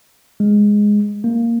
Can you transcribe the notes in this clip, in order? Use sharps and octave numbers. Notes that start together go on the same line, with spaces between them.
G#3
A#3